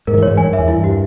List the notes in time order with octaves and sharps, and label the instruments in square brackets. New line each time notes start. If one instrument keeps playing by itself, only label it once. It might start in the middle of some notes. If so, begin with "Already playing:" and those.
[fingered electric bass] G#2 [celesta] A#4
[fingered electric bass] D#3
E3
[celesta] C#5
[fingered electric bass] G#2
[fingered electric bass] G2 [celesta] G#5
[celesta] E5
[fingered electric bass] E2
[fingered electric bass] G2 [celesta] E4
[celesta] G4